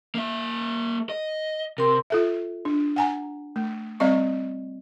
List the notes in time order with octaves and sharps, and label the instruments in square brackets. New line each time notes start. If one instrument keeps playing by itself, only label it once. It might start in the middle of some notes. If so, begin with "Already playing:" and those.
[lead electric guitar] A#3 E5
D#5
[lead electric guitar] C3 [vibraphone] A#4 C6
[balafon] F4 A4 E5
D4
F#5 G#5 A#5
A3
G3 C4 D5 D#5 C#6